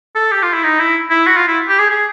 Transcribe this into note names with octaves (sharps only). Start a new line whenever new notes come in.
A4
G4
F4
E4
D#4
E4
E4
F#4
F4
E4
G4
G#4
G#4